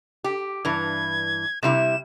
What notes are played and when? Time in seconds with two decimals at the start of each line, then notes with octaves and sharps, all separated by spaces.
0.24 G4
0.65 G2 E3 G#6
1.63 C3 G3 E4 E7